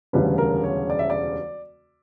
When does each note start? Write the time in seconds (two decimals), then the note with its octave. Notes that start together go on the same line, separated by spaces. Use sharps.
0.13 E1 D2 C#3 G3 B4
0.38 A#4
0.64 C#5
0.90 D5
0.99 E5
1.10 D5